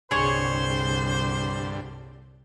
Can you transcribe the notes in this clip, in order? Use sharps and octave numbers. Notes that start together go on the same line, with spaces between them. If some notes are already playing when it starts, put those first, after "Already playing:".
C2 G2 D3 G#4 C5 C#5